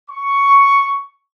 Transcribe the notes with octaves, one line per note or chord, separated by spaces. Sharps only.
C#6